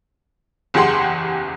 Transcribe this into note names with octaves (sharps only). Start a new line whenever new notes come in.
F#1 E2 G4 G#4 F#5 C6